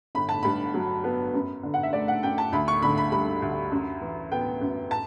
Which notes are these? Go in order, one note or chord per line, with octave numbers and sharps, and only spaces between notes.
G1 B5
A5
G2 B5
F#3
B3
F#2
D3
F#5
E5
A3 D5
F#5
F#2 G5
A5
D2 B5
C#6
D3 B5
B5
G3 B5
D2
F#2
E3
B3 G5
F#2
A5